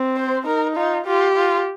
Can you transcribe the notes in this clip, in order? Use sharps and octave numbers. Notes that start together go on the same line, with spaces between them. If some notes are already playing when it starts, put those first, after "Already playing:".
Already playing: C4
C5
D#4 A#4
D#4 F4
F4 G4
F4